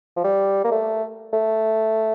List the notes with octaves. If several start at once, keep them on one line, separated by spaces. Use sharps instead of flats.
F3
G3
A#3
A3
A3